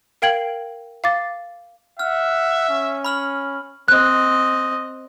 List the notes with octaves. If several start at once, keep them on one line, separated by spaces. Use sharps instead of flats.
A#4 F5 G5 G#6 F#7
F5 D6 A6
E5 F#5 F6
C#4
B5 F6 F#7
C4 D#5 F#6